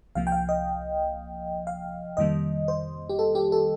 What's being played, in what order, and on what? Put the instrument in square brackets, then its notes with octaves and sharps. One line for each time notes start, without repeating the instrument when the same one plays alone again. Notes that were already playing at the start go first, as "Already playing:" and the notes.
[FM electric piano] C2 C3 F3 A#3 F5
G5
F5
D#5
F5
F2 C3 D#3 G3 A#3 D#5
C5
G4
A4
G4
A4